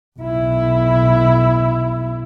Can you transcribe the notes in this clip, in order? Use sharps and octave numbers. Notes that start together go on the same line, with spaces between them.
B1 E4